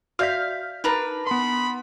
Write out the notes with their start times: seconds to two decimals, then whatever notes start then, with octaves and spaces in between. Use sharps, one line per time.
0.19 F#4 D5 E5 F5 F6 G6 B6
0.84 D4 D#4 A#4 B4
1.27 B3 B5 C6